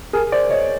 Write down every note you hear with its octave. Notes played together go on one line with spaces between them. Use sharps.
G#4 A#4
C5 D5
C#5 D#5